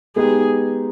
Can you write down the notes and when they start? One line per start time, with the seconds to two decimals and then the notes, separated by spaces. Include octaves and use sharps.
0.16 G#3 B3 D#4 G4 G#4